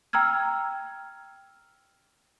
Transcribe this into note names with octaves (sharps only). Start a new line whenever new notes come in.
G5 A#5 E6 F6 G#6